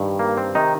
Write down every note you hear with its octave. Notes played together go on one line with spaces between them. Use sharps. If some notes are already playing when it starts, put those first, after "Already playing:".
Already playing: G2 D#3
A#3
C4
C3 D#3 D#4